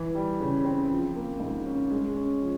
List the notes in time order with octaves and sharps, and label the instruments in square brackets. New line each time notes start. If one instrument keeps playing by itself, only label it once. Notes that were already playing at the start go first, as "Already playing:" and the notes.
Already playing: [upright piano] E3
G3
C#3
C4
F3
A#3
G#2
C#4
G#3
C#4
F3